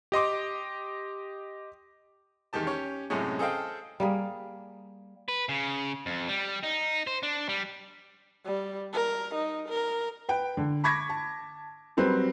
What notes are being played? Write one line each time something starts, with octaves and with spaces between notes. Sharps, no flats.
G4 D#5 C6 D6
E2 D#3 G#3 G4 A5
C#4 G4 C#5
F#2 A2 C3 G#3 C#4
G#4 A4 C5 D#5 F5 G5
G3 A#3 G#4
B4
C#3
F2
G3
D#4
C5
D4
G3
G3
A#4
D#4
A#4
B4 G5
D3
B5 C#6 D6 G#6 A#6 B6
A5
F#3 G3 C4 A#4 B4